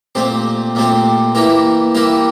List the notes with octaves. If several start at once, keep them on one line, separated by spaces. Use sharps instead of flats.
A#2 A3 C4 G4
A#2 A3 C4 G4
E3 A#3 E4 G4 A#4
E3 A#3 E4 G4 A#4